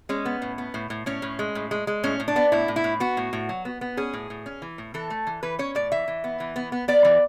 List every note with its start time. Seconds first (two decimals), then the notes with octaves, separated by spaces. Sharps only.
0.09 G#3 C#4
0.25 B3
0.42 A2
0.58 B3
0.74 A2
0.90 A2
1.06 A2 C#4
1.22 A2
1.39 G#3
1.55 A2
1.71 G#3
1.87 G#3
2.04 A2 C#4
2.20 A2
2.28 D4
2.36 B3
2.52 A2 E4
2.68 A2
2.76 E4
2.84 A2
3.00 B3 F#4
3.17 A2
3.33 A2
3.49 F#3
3.65 B3
3.81 B3
3.97 C#4 G#4
4.13 A2
4.30 A2
4.46 C#4
4.62 E3
4.78 A2
4.94 E3 A4
5.10 A3
5.27 E3
5.43 E3 B4
5.59 C#4 C#5
5.75 A2 D5
5.92 E3 E5
6.08 E3
6.24 B3
6.40 E3
6.56 B3
6.72 B3
6.88 B3 D5
7.05 E3